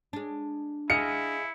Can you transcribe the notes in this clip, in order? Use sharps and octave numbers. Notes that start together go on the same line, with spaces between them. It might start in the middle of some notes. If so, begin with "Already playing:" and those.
G#3 D4
E4 G#4 D#5 F5 C#7